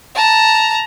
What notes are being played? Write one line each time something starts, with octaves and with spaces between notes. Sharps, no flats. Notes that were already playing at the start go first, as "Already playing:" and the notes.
A5 A#5